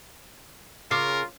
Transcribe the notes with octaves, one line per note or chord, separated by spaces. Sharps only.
C#3 F4 A#4 D6 F6 C7